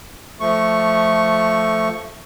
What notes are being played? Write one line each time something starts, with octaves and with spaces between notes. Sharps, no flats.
F3 A3 C#6